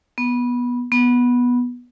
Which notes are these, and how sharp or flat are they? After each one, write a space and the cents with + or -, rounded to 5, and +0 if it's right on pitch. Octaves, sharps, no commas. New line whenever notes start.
B3 -15
B3 -10